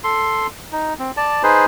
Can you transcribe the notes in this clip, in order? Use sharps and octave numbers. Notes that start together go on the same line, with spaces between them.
A4 C6
D#4
C4
D5 A5
D#4 G#4 B4 C5